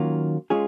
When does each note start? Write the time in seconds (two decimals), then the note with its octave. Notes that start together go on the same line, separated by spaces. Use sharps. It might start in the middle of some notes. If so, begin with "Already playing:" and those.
Already playing: D#3 F#3 A#3 C#4 F4
0.50 G#3 C#4 F4 G#4